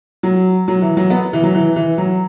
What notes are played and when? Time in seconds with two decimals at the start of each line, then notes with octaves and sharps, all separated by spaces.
0.23 F#3
0.68 F#3
0.82 E3
0.97 F#3
1.10 B3
1.33 E3
1.43 F#3
1.54 E3
1.76 E3
1.98 F#3